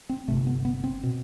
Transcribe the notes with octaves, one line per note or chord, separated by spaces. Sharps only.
C4
G1 F2 C3 A3
B3
B3
C4
B2